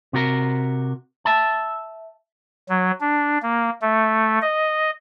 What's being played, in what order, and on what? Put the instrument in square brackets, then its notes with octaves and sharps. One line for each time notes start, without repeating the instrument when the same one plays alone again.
[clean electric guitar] C3 F#4 A#4
E5 A5
[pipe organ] F#3
D4
A#3
A3
D#5